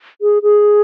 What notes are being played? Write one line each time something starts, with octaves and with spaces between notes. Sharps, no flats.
G#4
G#4